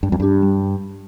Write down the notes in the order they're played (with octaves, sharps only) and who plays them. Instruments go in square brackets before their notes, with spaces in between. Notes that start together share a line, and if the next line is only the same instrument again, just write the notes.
[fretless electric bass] G2 [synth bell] G3
[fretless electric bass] F2
[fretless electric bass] G2 [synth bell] D4 G4
[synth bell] G3